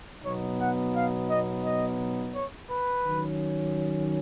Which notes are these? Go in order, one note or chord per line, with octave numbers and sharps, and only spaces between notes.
B2 F#3 B3 D#4 C#5
F#5
F5
D#5
D#5
C#5
B4
D#3 F#3 C#4